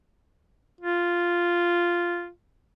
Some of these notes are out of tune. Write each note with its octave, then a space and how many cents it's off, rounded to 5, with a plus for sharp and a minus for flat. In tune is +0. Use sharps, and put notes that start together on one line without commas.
F4 -5